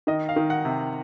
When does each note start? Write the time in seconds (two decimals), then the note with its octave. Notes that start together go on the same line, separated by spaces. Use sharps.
0.07 D#3 D#5
0.29 F5
0.36 D#3
0.50 F#5
0.65 C3